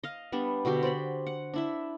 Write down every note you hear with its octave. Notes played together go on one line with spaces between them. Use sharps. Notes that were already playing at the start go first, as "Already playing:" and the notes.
D#5 F5
G3 B3 D4
B2 D3 F#4 G4
C5 D5 B5
F#5
D4 E4 E5